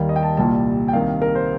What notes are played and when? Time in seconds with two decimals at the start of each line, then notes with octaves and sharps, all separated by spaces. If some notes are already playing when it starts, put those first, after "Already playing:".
Already playing: D#2 D#3 G3 F5
0.09 D#5
0.16 G5
0.23 A5
0.37 C2 A#2 G3 A5
0.88 G5
0.93 C2 C3 D#3 A#3 F5
1.22 A#4
1.35 C5